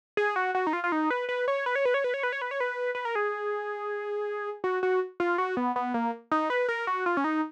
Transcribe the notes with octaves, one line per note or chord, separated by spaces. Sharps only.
G#4
F#4
F#4
D#4
F4
F4
D#4
B4
B4
C#5
B4
C#5
B4
C#5
B4
C#5
B4
C#5
B4
C#5
B4
B4
A#4
G#4
F#4
F#4
F4
F#4
B3
B3
A#3
D#4
B4
A#4
F#4
F4
C#4
D#4